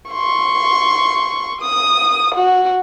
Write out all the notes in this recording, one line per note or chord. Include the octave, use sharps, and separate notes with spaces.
C6 C#6
D#6
F#4